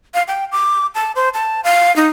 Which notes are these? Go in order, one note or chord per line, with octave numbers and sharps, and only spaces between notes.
F5
G5
D6
A5
C5
A5
F5
D#4